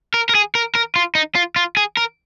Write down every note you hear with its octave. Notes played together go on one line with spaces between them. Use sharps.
A#4
A#4
G#4
A#4
A#4
F4
D#4
F4
F4
G#4
A#4